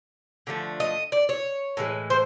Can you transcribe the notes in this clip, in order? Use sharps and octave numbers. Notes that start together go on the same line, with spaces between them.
D3 F3 A3
D#5
D5
C#5
A2 E3 G#3
C5